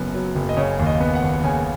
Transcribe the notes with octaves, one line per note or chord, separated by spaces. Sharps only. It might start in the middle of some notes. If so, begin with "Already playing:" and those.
Already playing: F#1 F#2 B3
F#3
F#1
D#5
C#3 C#5
D#2
D#5
B3
F#5
D#2
C#3 G#5